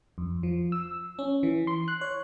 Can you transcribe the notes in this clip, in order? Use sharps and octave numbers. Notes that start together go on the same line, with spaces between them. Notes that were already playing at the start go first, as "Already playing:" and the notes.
F2
F3
E6
C#4
E3
C6
F#6
C#5